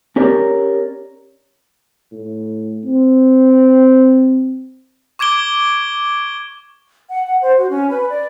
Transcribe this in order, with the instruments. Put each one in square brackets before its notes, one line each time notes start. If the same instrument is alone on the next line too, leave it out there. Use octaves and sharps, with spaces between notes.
[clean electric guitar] C#4 G4 A#4 C#5 D5
[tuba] A2
C4
[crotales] C#6 D6 G#6 D7 G7
[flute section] F#5
F#5
C5
F#4
C#4
B4
D5